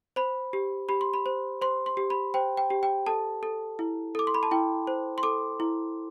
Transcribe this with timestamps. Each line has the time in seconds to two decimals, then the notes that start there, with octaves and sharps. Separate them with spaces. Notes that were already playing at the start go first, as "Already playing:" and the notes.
0.16 C5 B5
0.53 G4
0.89 G4 B5
1.01 C6
1.14 B5
1.26 C5
1.62 C5 C6
1.86 C6
1.97 G4
2.10 B5
2.34 C5 G5
2.57 G5
2.70 G4
2.83 G5
3.07 A4 A5
3.43 A4
3.79 E4
4.15 A4 D6
4.27 C6
4.34 B5
4.43 A5
4.51 E4 G5
4.87 C5
5.18 C6
5.23 A4 D6
5.60 E4